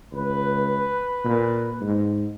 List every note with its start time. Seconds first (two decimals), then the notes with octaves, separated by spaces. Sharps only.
0.13 C#2 B4
1.25 A#2
1.81 G#2